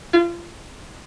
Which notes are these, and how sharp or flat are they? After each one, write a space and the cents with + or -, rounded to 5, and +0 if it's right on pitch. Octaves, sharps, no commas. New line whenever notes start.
F4 -30